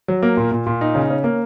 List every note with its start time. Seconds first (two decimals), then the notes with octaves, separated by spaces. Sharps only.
0.08 F#3
0.23 A#3
0.37 A#2
0.51 A#2
0.66 A#2
0.81 D#4
0.95 C#3
1.10 C#4
1.24 A#3